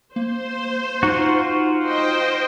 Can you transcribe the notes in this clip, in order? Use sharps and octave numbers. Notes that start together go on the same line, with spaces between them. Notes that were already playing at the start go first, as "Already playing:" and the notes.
A#3 C5
D#4 F4 F#4
C5 D#5 G5